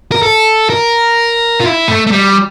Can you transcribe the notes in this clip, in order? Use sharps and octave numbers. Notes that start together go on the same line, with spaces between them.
A#4
A4
A#4
F4
E4
A3
A3
G3